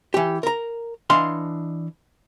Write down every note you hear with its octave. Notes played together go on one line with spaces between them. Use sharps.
E3 G4
A#4 A#5
E3 D4 D#5 F5 C6